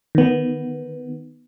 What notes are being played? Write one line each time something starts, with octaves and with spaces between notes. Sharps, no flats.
D#3 B3